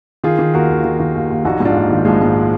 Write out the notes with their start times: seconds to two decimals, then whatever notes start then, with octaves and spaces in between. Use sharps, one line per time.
0.24 D#3 F4 G#4
0.38 D#3
0.54 D#2 F#4 A#4
0.69 D#2
0.84 D#3
1.00 D#3
1.15 D#2
1.30 D#2
1.45 A#1 D#4 F#4
1.60 G#2
1.65 D4 F4
1.75 A#1
1.91 D#3
2.05 A#1 F3 G#3
2.21 G#2